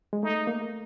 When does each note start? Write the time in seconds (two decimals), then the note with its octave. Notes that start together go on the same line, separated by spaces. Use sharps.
0.13 G#3
0.23 A3 D#4
0.47 A#3